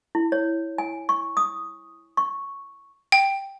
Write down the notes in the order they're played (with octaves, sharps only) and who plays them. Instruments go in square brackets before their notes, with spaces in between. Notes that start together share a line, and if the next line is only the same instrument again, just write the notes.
[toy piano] E4
C#5
G#5
C#6
D#6
C#6
[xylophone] G5